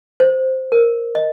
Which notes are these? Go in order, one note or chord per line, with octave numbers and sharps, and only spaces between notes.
C5
A#4
D#5